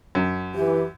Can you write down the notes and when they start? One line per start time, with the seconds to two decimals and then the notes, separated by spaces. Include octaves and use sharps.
0.15 F#2
0.55 E3 G4